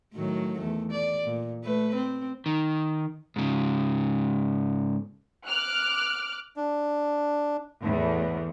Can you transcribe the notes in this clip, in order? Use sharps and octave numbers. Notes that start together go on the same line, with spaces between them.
A2 D#3 F#3
E2 A3
D5
A#2
A3 B4
C4
D#3
G#2 C#3
D6 F6 F#6
D4
E2 A2